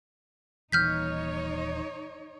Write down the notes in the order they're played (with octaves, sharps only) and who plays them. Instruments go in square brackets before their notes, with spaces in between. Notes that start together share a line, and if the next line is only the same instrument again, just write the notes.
[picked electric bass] D#1 D#2 E3 [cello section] D#4 C#5 [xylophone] F6 G6 B6